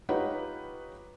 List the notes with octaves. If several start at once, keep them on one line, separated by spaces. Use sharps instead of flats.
D#4 F4 G4 B4 C#5 F#5